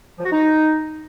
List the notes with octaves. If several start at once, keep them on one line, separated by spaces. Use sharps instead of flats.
F3
F#4
D#4